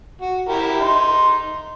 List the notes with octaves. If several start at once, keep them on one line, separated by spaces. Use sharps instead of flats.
F#4
E4 G4 A#4
D#4 C6